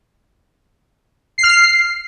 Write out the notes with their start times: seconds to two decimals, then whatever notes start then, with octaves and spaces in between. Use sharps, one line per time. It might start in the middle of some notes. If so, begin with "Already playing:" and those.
1.38 C7
1.43 F6
1.49 C7